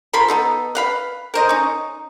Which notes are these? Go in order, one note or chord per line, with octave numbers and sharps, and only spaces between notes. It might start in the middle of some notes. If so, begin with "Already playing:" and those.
F3 A#4 B5 C6
B3 D#4 A4
B4 F5 B5
A#4 C5 D#5
C#4 D#4